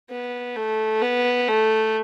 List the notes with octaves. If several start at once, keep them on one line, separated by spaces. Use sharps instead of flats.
B3
A3
B3
A3